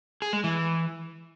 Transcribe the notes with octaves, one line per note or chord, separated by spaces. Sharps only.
G#4
G#3
E3